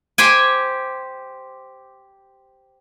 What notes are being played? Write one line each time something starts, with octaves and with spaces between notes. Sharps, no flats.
G4 C5 G5 G#5